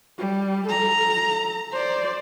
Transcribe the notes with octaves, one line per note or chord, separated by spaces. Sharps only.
G3
A4 A#5
C5 D5